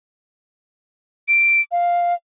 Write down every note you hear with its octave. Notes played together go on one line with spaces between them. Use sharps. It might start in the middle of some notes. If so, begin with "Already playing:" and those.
D7
F5